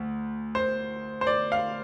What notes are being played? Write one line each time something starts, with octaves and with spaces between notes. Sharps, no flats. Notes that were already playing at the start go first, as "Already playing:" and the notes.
Already playing: D2
C5
C5
D5
F5